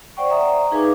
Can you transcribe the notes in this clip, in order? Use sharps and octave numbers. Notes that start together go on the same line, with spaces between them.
C5 D5 F#5 G5 C#6
D5 E5 A#5 D#6
D#4 G#4 B4 F5 G#5 D6